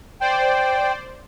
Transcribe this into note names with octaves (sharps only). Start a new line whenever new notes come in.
C5 D5 G5